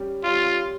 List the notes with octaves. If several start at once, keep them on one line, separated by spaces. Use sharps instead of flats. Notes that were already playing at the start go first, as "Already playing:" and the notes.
Already playing: G3 C#4 G4
G3 C#4 F4 G4